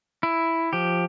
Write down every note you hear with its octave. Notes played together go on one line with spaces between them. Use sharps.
E4
F3 G4